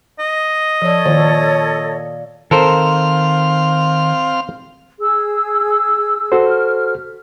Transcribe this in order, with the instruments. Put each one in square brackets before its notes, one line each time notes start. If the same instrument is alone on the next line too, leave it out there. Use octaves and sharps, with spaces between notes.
[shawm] D#5
[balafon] F3 D5 [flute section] A4 C#5
[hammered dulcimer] A#2 [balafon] D#3
[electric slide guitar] D#3 A5 [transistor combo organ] C4 F5 [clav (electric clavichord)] A4 A#4 C5
[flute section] G#4 E6
[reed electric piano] F#4 A4 C5
[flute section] F6